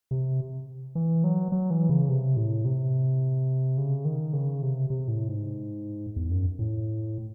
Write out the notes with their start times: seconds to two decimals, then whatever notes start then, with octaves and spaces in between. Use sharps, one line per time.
0.11 C3
0.95 E3
1.24 F#3
1.52 F#3
1.70 E3
1.89 C#3
2.09 C3
2.37 A2
2.65 C3
3.78 C#3
4.05 D#3
4.33 C#3
4.62 C3
4.90 C3
5.08 A2
5.28 G#2
6.16 E2
6.31 F#2
6.59 A2